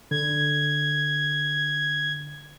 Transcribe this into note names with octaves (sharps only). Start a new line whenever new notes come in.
D3 G#6